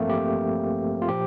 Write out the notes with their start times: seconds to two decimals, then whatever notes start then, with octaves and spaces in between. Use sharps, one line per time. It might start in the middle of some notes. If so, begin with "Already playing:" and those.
Already playing: A1 G2 F3 A3 A#3 C4
0.10 G4
1.02 F4
1.08 A#2 F3 G4